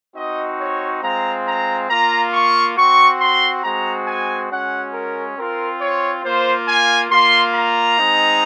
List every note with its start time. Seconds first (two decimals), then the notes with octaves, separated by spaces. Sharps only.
0.15 C4 D#4 F#4 D#5
0.59 C#5
1.02 G#3 C4 F4 A#5
1.46 A#5
1.88 A#3 F4 A#5
2.33 C#6
2.76 C4 F#4 C#6
3.20 C6
3.62 G#3 C4 F#4 A#5
4.06 G#5
4.50 G#3 C#4 F#4 F#5
4.93 A#4
5.37 C4 F4 A#4
5.80 C#5
6.23 A#3 F4 C5
6.67 G#5
7.10 A#3 F4 C6
7.54 A#5
7.98 G#3 C4 D#4